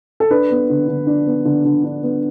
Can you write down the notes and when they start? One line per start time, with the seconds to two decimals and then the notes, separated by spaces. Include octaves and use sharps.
0.20 A4
0.30 D4 B4
0.51 B3
0.70 D3
0.88 D3
1.07 D4
1.26 B3
1.45 D3
1.65 D3
1.84 D4
2.03 B3